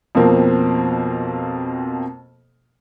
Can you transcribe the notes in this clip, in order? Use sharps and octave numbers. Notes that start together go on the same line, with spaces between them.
F2 B2 F3 A#3 C4